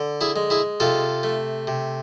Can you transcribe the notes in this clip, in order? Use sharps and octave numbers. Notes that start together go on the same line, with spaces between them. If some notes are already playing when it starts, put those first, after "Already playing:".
Already playing: D3
E4 G#4
G#3
E4 G#4
C3 F4 A4
A3
C3